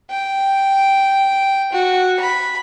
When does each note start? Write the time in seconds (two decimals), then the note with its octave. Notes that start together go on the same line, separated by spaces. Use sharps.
0.10 G5
1.72 F#4
2.19 B5